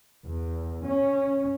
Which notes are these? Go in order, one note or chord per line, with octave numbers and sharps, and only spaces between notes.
E2
C#4